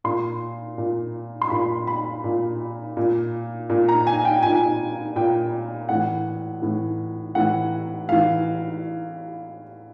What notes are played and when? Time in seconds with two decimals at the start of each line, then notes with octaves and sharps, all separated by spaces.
0.04 A#2 C6
0.78 A#2
1.42 C6
1.50 A#2 B5
1.87 B5
2.24 A#2
2.97 A#2
3.70 A#2
3.89 A#5
4.07 G#5
4.25 G5
4.43 A#2 G#5
5.16 A#2 G5
5.89 A2 E3 F#5
6.62 A2 E3
7.35 A2 E3 F#5
8.08 A2 E3 F5